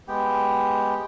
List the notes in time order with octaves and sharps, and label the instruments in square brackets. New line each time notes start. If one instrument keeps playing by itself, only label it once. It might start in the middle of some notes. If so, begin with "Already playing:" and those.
[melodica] G#3 B3 G4 G5